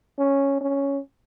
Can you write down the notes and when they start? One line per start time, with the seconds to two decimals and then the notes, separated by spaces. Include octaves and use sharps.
0.18 C#4
0.61 C#4